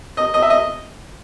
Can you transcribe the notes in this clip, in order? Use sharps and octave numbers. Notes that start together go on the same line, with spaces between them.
D#5
D#5
E5
D#5